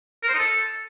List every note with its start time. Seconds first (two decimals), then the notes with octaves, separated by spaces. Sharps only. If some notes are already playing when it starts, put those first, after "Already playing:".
0.23 A#4
0.28 C5
0.34 D#4
0.39 A4